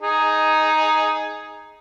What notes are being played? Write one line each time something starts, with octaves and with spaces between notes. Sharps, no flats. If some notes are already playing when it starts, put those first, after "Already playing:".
D#4 G#4